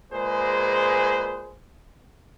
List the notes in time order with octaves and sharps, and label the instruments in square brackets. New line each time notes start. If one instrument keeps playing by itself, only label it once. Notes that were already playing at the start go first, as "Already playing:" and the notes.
[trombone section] A#2 G#3 G#4 B4 C5